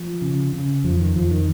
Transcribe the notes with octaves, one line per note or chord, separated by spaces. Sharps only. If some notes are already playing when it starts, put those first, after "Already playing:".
Already playing: F3
C#3
C#3
F2 F3
D#3
F2 F3
D#3